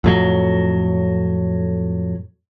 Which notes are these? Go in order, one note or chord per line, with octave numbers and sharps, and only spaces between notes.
F2 A2 F#3